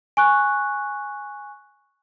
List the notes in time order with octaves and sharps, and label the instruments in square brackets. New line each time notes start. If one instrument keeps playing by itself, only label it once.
[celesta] G#5 C#6 F#6